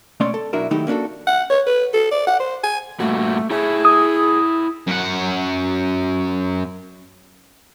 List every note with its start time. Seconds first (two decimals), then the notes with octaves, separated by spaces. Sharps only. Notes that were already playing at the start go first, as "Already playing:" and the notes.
0.20 B2 A3 C#4 C#5 D5 C6
0.34 A4
0.53 B1 F#2 D4 E4 F#4 A#4
0.71 D#3 F#3 A3 D#4 E4 G4
0.87 A#3 C#4 D4 F#4 A4
1.27 F#5
1.50 C#5
1.67 B4
1.93 A4
2.12 D5
2.27 F#5
2.40 C5
2.64 G#5
3.00 G2 A#2 A3 F#4
3.50 E4 G#4 C#5 E5
3.85 D#6
4.87 F#2 F#5